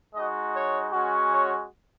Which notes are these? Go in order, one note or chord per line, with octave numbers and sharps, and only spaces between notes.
G#3 D#4 F#4 D#5
C#5
G#3 C#4 F#4
C#5